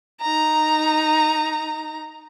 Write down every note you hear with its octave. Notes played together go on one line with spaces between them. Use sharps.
D#4 A#5